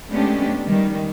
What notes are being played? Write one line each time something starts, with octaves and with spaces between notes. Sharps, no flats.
G#3 A3 B3 C#4 D4 G4
D#3 G3